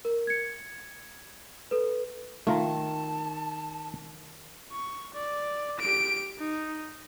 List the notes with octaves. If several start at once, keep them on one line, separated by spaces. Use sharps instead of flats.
A#4
G#6 C#7
A4 B4
D#3 A3 F4 A5 A#5
C#6
D5
G4 D7
D#4